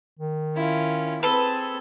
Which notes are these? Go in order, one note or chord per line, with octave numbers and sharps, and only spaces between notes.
D#3
C#4 E4 F4
C4 G#4 A4 B4